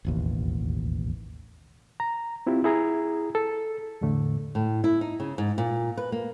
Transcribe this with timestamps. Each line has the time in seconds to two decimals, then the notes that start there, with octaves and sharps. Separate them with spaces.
0.05 E1 A1 D#2
2.00 A#5
2.47 C4 E4 F4 G4
2.64 E4 G#4 A#5
3.35 A4
4.01 E2 A2 D3 A3
4.55 A2
4.84 E4
5.01 D#4
5.20 C#3
5.38 G#2
5.58 A#2
5.97 B4
6.12 A#3